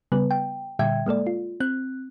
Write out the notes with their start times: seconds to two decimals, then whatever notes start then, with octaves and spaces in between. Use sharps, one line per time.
0.12 C#3 G3 B3 B4
0.31 G5
0.79 A#2 D3 G3 E5 G5 G#6
1.06 G#3 A#3 A4 D5
1.27 F4
1.60 C4 F#6